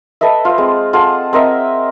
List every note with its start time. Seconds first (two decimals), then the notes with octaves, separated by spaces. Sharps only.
0.21 A4 B4 D#5 E5
0.45 F4 C5
0.58 G#3 C4
0.93 F4 G#4 A4 F#5
1.33 C4 A#4 D#5 E5